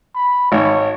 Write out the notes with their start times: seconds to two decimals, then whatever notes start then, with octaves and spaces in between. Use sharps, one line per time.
0.15 B5
0.52 G#1 C#5